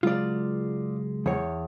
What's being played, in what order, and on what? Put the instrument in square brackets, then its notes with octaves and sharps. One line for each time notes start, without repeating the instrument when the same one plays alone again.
[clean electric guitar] C#2 F#3 G#3 [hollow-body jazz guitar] F4 D5
[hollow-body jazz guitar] E2 C#5